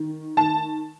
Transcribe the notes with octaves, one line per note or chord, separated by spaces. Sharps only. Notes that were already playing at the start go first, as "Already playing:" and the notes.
Already playing: D#3
D#3 A5